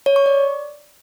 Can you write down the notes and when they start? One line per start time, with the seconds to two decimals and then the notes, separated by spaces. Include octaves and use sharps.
0.06 C#5
0.16 C#6
0.26 D5